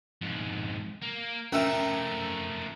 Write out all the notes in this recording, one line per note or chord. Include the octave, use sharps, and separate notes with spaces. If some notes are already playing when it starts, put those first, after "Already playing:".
F2 G#2
A#3
F3 A3 C#4 A#4 E5 G5 A#5